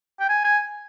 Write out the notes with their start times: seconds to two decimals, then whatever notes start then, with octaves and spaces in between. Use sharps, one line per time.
0.20 G5
0.29 G#5
0.44 G#5